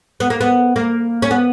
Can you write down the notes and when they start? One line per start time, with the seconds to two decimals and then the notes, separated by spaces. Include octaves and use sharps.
0.20 B3
0.30 A#3
0.41 B3
0.76 A#3
1.22 C#4
1.31 B3